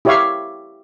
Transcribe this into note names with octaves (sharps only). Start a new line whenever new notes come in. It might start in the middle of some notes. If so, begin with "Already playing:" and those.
E4 G4 C#5 E5 F5 C#6